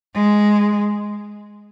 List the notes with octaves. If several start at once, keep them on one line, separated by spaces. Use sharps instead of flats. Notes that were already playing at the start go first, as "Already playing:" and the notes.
G#3